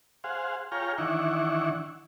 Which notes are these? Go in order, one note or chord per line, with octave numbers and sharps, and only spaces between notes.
G#4 C5 F5 F#5
F4 G#4 C#5 G5 A#5 F6
D#3 E3 D4 E4 F#5 C#6